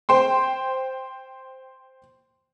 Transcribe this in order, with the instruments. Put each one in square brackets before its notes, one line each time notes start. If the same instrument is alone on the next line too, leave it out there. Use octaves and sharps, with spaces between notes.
[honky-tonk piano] C5 G5 C6